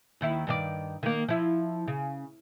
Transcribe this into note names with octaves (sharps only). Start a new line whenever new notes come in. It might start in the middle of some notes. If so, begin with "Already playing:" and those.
D#2 D#3 E4
G2 D#3 D5
D#3 A#3
F3 E4
C#3